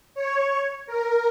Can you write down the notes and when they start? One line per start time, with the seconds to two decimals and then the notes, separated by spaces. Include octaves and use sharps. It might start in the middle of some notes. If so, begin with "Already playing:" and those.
0.14 C#5
0.87 A#4